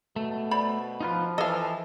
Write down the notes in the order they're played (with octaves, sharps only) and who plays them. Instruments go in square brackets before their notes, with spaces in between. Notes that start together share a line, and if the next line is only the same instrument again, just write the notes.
[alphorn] B2 [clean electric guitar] A3
[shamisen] C5 D5 B5
[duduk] F3 [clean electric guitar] D#4 F4 B4
[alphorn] E3 [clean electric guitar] A4 [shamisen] D#5 F5